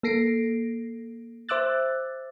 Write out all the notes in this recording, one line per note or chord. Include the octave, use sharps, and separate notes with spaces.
A#3 A4 A#6 C7 D7
C5 E5 D6 E6 F#6 A6